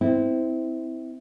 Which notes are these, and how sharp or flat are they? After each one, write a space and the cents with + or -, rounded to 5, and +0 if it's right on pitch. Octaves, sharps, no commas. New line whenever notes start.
C4 -20 E4 -20